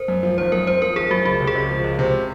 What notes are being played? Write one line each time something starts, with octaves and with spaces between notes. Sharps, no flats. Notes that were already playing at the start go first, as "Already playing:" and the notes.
Already playing: A#4 C5
F#2
F3
G#1 C5
F#2 A#4
C4 C5
F3 A#4
G#1 G#4
F#2 F#4
C#2 F#4
C3
G#4
C#2
F3
C#2
C3